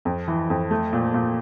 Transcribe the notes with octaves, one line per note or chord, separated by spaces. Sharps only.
F2
E3
F2
A3
A#2
A#2